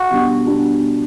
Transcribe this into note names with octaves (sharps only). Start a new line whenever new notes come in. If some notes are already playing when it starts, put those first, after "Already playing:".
Already playing: F#4
B2 G3 D4 G4
B2 G3 D4 G4